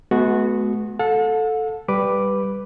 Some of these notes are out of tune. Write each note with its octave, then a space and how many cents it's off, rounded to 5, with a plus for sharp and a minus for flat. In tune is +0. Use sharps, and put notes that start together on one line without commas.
G#3 +45 B3 +0 F#4 -5
A4 +0 F#5 -45
G3 +0 B4 +0 D6 +0